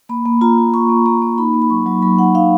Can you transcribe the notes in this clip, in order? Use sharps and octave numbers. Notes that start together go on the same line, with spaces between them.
A#3 B5
A#3
F4 A#5
F4
F4 C#6
A#3
A#3 A#5
A#3
D#4 B5
A#3
B5
F#3 C#6
F#3
F#3 B5
D#4 F#5
D#4 F5